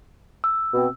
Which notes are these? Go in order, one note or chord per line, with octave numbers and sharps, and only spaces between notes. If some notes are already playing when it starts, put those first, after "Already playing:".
E6
B2 C4